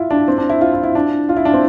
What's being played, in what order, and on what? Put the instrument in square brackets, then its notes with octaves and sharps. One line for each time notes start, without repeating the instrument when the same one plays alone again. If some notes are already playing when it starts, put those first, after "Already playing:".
Already playing: [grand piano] E4 F4
D4
C4
D4
E4
F4
E4
E4
D4
F4
E4
D4
C4